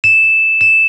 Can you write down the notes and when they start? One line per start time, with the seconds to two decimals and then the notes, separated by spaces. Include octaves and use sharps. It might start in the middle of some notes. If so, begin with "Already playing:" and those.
0.04 E7
0.61 E7